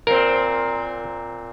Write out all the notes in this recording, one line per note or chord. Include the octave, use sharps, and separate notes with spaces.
A#2 C4 A#4